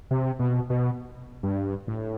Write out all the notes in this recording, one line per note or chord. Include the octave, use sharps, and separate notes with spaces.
C3
B2
B2
G2
A2